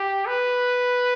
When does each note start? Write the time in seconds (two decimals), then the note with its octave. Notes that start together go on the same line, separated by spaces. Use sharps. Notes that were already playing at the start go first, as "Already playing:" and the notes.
Already playing: G4
0.27 B4